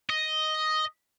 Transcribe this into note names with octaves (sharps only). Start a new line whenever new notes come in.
D#5